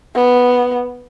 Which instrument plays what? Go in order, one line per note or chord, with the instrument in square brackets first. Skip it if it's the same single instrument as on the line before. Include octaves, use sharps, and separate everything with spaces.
[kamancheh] B3